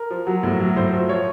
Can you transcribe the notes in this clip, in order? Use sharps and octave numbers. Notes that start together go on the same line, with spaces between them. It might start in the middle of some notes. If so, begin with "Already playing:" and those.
Already playing: A#4
F3
F#3
A2
F#3
A2 C5
F3
F3 C#5